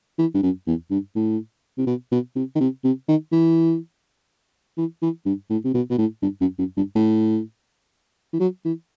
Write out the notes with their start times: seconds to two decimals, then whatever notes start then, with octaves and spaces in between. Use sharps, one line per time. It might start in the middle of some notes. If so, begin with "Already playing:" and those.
0.18 E3
0.34 G2
0.43 F#2
0.67 E2
0.90 G2
1.15 A2
1.78 C3
1.87 B2
2.12 B2
2.36 C3
2.55 D#3
2.60 C3
2.84 C3
3.08 D#3
3.32 E3
4.77 E3
5.02 E3
5.25 G2
5.50 A2
5.64 C3
5.74 B2
5.90 B2
5.98 A2
6.22 G2
6.41 F#2
6.58 F#2
6.77 G2
6.95 A2
8.33 E3
8.40 F#3
8.65 E3